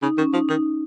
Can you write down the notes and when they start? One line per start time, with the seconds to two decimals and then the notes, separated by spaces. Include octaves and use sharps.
0.03 C#3 D#4
0.18 D#3 C#4
0.34 F3 D#4
0.49 D#3 D#4